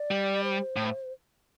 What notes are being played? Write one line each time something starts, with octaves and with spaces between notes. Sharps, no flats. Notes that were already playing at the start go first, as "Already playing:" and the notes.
Already playing: D5
G3
C5
A2